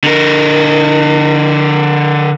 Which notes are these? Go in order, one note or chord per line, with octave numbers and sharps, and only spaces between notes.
D3 A#4